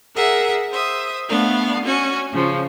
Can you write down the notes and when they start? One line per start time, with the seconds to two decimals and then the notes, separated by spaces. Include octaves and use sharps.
0.15 G#4 A#4 E5 F#5
0.70 C5 E5 D#6
1.28 A3 B3 D4 F5
1.85 C#4 F#4 G#5
2.32 C#3 F3